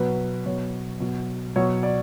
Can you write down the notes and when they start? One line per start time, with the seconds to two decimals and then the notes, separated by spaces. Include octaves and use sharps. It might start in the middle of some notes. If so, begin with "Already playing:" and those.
Already playing: B2 F#3 B4
0.46 B2 F#3 C#5
1.00 B2 F#3
1.56 B2 F#3 C#5
1.83 D5